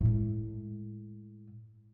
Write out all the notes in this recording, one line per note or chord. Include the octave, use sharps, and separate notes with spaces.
A2 G#3